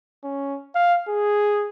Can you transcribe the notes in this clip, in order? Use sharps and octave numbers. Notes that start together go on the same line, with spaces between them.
C#4
F5
G#4